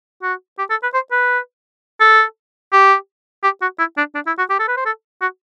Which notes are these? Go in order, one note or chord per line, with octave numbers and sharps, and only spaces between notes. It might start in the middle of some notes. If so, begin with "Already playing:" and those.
F#4
G4
A4
B4
C5
B4
A4
G4
G4
F#4
E4
D4
D4
E4
F#4
G4
A4
B4
C5
A4
F#4